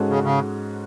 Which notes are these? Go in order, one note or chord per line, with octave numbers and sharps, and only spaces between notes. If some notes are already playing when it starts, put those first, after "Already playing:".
Already playing: G#2 G#3 C#4 F#4 A4
C#3
C#3